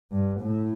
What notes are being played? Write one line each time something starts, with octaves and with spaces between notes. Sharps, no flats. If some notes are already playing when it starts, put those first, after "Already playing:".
G2
A2